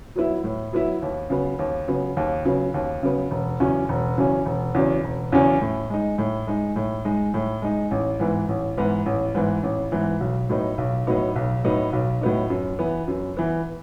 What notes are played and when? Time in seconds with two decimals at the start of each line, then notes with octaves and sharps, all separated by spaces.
0.16 F#3 B3 E4
0.44 A2
0.73 F#3 B3 E4
1.02 D#2
1.30 C#3 F#3 B3
1.59 D#2
1.88 C#3 F#3 B3
2.17 D#2
2.45 C#3 F#3 B3
2.74 D#2
3.03 C#3 F#3 B3
3.31 E1
3.60 E2 C#3 F#3 C#4
3.89 E1
4.18 E2 C#3 F#3 C#4
4.46 E1
4.74 E2 C#3 F#3 C#4
5.04 E1
5.32 E2 C#3 F#3 C#4
5.62 A2
5.90 G#3 D#4
6.18 A2
6.47 G#3 D#4
6.76 A2
7.05 G#3 D#4
7.34 A2
7.62 G#3 D#4
7.91 A1
8.20 G#2 E3 B3
8.48 A1
8.77 G#2 E3 B3
9.06 A1
9.35 G#2 E3 B3
9.63 A1
9.92 G#2 E3 B3
10.20 B1
10.49 A2 F#3 B3 D#4
10.78 B1
11.07 A2 F#3 B3 D#4
11.36 B1
11.64 A2 F#3 B3 D#4
11.93 B1
12.21 A2 F#3 B3 D#4
12.50 F#2
12.79 E3 B3
13.08 F#2
13.37 E3 B3